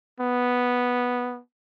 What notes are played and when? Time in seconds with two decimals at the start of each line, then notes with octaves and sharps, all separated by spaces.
0.20 B3